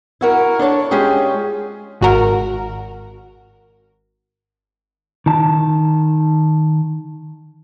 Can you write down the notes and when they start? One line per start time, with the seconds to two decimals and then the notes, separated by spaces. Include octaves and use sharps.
0.21 E4 F#4 A#4
0.59 D4 A4 C#5 A5
0.91 G#3 C#4 F4 G4 G#4
2.01 G#1 F#4 A#4
5.26 D#3 A5